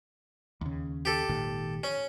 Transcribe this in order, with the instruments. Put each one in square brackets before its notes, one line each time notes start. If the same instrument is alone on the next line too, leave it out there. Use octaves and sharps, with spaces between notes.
[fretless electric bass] D#2 C#3
[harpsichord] G4 A4
[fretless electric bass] G#1 A#2 D#3
[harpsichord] C#4